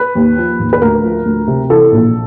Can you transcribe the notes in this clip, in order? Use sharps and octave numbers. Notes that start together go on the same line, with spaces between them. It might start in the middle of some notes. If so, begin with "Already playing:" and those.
Already playing: B4
D#2
F3
D#2
B4
D2 A#4
F3
D2
C3
E3 A4
A#1